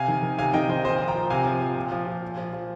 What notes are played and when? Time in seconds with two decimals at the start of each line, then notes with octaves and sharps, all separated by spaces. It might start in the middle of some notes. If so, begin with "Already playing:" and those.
Already playing: C3 F5 G#5
0.08 D#3
0.23 D#3
0.38 C3 F5 G#5
0.54 D#3 D#5 G5
0.69 D#3 C5 D#5
0.84 A#2 C5 D#5
1.00 F3
1.08 G5 A#5
1.15 F3
1.30 C3 F5 G#5
1.46 F3
1.61 F3
1.76 A#2
1.92 F3
2.07 F3
2.22 A#2
2.38 F3
2.53 F3